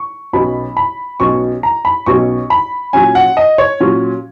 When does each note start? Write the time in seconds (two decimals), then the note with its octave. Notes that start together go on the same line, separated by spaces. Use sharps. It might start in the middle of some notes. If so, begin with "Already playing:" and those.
Already playing: C#6
0.33 B1 B2 F#3 C#4 B5
0.77 B5
1.20 B1 B2 F#3 C#4 C#6
1.63 A#5
1.85 B5
2.06 B1 B2 F#3 C#4 C#6
2.50 B5
2.93 A#2 F#3 C#4 G#5
3.15 F#5
3.37 D#5
3.58 C#5
3.80 A#2 F#3 C#4